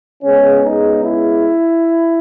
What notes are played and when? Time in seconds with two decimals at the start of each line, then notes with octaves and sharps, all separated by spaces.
0.23 C#3 G#3 B3 C#4
0.63 D#4
1.03 E4